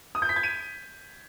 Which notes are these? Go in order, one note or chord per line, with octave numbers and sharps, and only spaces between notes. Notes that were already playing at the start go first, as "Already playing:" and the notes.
D#6
G6
B6
G#6
D#7